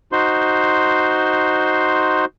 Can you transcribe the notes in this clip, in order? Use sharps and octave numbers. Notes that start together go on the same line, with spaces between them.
D#4 F#4 C5 C6